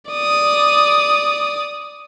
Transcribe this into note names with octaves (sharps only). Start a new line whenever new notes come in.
D5 D#6